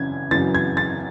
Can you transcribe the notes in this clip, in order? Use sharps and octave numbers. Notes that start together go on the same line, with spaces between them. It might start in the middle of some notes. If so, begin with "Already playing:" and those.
Already playing: F#2 C#3 E3 G#6
F#2 C#3 E3 A6
G#6
A6